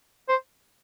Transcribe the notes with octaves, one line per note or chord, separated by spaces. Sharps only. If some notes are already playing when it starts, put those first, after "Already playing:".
C5